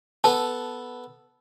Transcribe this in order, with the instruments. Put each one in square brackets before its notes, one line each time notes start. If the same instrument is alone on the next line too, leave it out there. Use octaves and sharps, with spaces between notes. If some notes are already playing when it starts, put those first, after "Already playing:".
[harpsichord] B3 A4 [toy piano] A5